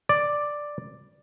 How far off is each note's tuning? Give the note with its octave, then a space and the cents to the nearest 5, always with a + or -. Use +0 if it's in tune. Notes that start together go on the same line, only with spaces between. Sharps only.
D5 +5